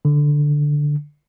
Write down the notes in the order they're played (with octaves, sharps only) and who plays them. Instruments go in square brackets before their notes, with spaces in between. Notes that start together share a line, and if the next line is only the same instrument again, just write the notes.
[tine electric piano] D3